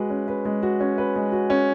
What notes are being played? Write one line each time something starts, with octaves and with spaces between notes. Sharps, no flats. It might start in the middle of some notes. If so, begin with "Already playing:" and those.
Already playing: G#3 F#4 B4
C#4
B4
G#3
F#4
C#4
B4
G#3
F#4
C#4